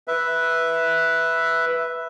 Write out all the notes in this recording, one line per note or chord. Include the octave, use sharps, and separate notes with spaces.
B4 E5